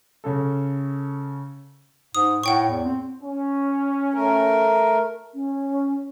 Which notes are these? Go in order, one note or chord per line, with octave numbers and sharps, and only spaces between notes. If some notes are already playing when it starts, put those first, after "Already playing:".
C#3 C#4 A4
G#2 D#6
A2 F#5 G5 C#6
E2
C4
C#4
A3 A#4
C#4